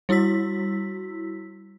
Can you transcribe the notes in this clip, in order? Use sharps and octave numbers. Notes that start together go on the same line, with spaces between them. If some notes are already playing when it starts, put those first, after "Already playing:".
G3 E4 F#4 E6 B6